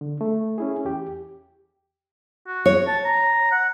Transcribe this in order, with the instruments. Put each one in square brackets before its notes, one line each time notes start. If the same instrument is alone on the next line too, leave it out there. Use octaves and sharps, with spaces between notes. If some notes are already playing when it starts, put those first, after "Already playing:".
[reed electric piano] D3
A3
C#4 E4 G#4
E2 G4
[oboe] F#4
[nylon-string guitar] C#5
[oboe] A5
A#5
F#5